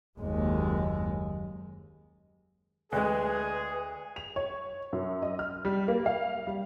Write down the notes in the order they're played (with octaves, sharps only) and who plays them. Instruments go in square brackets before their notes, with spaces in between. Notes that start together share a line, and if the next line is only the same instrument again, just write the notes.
[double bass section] F#1 D#2 G#3
[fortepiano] D2 G#3 [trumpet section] G#4 [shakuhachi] B4
[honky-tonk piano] F7
C#5
F#2
D#5
F6
G3
A#3
F5
G3